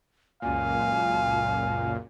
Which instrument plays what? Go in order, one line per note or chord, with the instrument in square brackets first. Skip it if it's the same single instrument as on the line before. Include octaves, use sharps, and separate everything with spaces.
[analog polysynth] C#2 F#2 A#2 [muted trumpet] F5 [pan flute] G#5